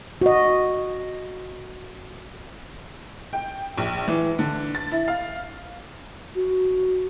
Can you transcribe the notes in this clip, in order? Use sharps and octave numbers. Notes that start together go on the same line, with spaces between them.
F#4 D#5
G5
A#1
E3
D3
A6
E4
F5
F#4